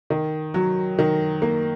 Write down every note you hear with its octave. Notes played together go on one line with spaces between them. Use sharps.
D#3
F#3
D#3
A#3